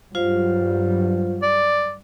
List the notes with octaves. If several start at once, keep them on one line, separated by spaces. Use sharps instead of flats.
G2 F#3 G3 F4 C5 F5
D5